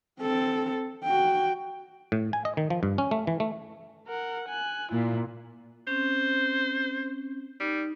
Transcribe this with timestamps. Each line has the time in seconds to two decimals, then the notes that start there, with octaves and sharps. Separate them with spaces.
0.20 C4 A4
1.04 F#4 G5
2.12 A2
2.33 G#5
2.45 D#5
2.57 D#3
2.70 F3
2.83 G2
2.98 C#4
3.11 A3
3.27 E3
3.40 A3
4.08 A#4 F#5
4.48 G#5 F#6
4.92 A#2 E4 F4
5.87 C4 C#4 C5
7.60 G3 D#4